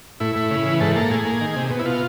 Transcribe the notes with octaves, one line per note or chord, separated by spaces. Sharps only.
A2 E4
A2
C#3
E3
G#2 A4
A#3 A4
A2 G#4
A#3
D#3
C3
B2
E4
B2 F4